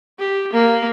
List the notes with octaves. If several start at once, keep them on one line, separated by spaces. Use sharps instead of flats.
G4
A#3